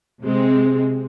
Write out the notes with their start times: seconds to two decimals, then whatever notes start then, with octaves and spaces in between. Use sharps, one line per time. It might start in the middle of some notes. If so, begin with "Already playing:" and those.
0.22 C3 G#3 C4